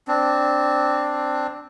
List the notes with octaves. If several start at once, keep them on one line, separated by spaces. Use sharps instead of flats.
C4 D4